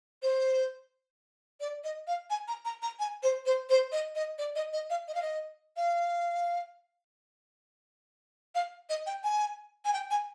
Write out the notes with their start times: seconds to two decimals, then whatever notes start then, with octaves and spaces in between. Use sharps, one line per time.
0.22 C5
1.60 D5
1.84 D#5
2.07 F5
2.30 G#5
2.48 A#5
2.65 A#5
2.82 A#5
2.99 G#5
3.23 C5
3.46 C5
3.70 C5
3.92 D#5
4.15 D#5
4.39 D5
4.56 D#5
4.73 D#5
4.90 F5
5.08 D#5
5.15 F5
5.22 D#5
5.77 F5
8.55 F5
8.90 D#5
9.06 G5
9.24 G#5
9.85 G#5
9.93 G5
10.11 G#5